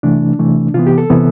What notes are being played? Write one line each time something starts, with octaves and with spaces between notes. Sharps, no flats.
C3 E3 A3 D4
C3 E3 A3
C3 E3 B3 F4
G4
A4
C3 E3 B3